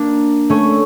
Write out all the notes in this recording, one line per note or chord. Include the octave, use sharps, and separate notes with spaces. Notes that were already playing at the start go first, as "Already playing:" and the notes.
Already playing: A#3 D4
A3 C#4